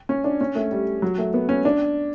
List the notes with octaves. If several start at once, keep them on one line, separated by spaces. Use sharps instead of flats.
C#4
D4
C#4
A3
G3
F#3
A3
B3
C#4
D4